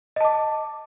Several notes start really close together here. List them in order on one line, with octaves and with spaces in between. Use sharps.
D#5 A5 D6